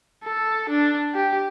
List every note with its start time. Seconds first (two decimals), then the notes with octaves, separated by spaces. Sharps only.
0.24 A4
0.69 D4
1.15 G4